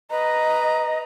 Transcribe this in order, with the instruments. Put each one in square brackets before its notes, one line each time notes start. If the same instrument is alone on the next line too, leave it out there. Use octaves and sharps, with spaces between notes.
[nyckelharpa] B4 A#5 [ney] D#5